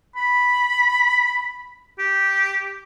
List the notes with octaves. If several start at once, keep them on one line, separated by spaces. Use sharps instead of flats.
B5
G4